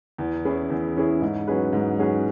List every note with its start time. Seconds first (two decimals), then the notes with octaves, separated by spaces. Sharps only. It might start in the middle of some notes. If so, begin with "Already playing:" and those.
0.18 E2
0.45 E3 C#4 E4 G#4
0.70 E2
0.96 E3 C#4 E4 G#4
1.21 G#2
1.47 F#3 C#4 G#4 B4
1.73 G#2
1.99 F#3 C#4 G#4 B4